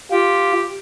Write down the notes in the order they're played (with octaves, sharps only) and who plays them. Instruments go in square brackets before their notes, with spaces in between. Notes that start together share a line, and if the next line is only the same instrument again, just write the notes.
[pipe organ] F4 [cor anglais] G4